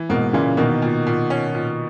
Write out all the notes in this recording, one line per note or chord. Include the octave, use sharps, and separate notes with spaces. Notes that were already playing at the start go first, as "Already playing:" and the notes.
Already playing: E3
G#2 B2 A#3
A#2 C#3 E3
B2 D#3 A#3
A#2
A#2
C#4
A#2